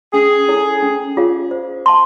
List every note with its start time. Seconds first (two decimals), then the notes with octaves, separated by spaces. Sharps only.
0.13 C#4 G#4
0.48 E4 A4 C#5
0.83 C#4
1.17 F4 G#4 C#5 F5
1.51 C5
1.86 F5 A5 C6